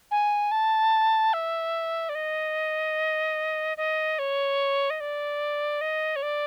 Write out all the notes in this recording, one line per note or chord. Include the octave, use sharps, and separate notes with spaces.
G#5
A5
E5
D5
D#5
D#5
C#5
D#5
D5
D#5
C#5
D5